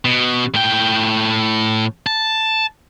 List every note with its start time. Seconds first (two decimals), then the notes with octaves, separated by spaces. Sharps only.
0.05 B2
0.54 A2 G5
2.07 A5